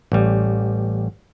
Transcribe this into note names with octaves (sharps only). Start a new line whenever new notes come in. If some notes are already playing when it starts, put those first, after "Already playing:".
A1 G3